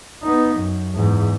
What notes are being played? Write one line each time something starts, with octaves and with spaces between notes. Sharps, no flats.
B3 D#4
F#2
E2 G#2